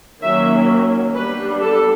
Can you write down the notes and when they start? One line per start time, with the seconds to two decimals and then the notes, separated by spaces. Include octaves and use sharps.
0.22 D#3 F#3 A#3 C#4 E5
1.15 G3 B3 D4 B4
1.62 A4